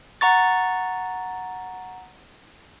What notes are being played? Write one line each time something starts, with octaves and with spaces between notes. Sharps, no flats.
F#5 A#5 C#6 A6